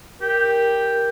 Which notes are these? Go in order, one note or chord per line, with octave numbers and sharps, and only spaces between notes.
G4 A#4